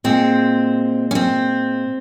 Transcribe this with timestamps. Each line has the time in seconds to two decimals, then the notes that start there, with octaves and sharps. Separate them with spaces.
0.04 A#2 G#3 C4
1.11 C#4
1.15 C4